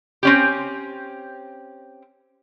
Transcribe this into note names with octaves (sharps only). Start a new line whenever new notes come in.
C4 C#4 G4